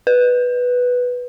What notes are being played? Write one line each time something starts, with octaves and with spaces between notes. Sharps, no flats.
B4